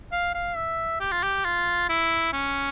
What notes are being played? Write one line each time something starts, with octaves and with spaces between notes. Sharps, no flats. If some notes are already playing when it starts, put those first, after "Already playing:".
F5
F5
E5
G4
F4
G4
F4
E4
C#4